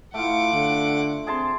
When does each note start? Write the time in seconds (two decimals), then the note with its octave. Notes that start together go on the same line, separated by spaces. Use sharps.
0.14 A3 E4 F4 F#5 D6
0.53 D3
1.27 C4 G#4 A5 C6